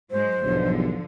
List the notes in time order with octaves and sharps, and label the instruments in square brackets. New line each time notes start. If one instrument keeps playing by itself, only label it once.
[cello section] G#2 F#3 G#3 [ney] C5
[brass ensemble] B1 E2 G2 [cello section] D3 F3